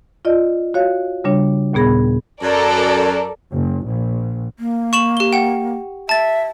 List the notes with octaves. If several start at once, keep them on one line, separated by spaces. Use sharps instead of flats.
F4 D5 D#5
F#4 C#5 F5
C#3 G3 D4 C#5
D#2 A#2 B3 G#4 B5 A#6
F#2 A4 A#4 D5
F#1
A#1
A#3
C#6 E7 F#7
G4 G7
F#5 G5
E5 A5 A6